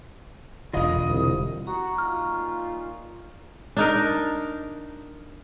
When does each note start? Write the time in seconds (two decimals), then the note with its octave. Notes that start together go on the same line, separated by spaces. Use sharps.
0.73 E1 D3 F4 D#5 F5 D#6
1.10 C2
1.67 F#4 A#5 C#6
1.98 A#2 D#4 F4 F6
3.77 D4 D#4 A#4